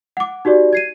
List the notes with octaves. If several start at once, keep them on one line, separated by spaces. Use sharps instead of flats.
F#5 D6
D#4 F#4 G4 D5
G#6 C7 D#7